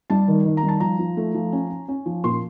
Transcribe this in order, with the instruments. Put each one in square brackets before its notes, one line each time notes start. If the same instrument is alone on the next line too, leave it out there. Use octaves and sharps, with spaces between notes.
[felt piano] G3 A5
D#3
D#3
A#5
G3
A5
F3 A#5
F3
A3
F3
C#4
C#4
C#4
F3
A#2 C6